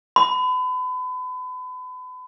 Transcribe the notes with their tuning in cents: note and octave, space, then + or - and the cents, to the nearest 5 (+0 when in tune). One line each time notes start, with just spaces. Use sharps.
B5 +35